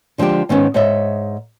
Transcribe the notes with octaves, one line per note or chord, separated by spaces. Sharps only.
D3 F3 G#3 D4 G4
G#2 D#3 B3 C#4
G#2 C#5 D#5 E5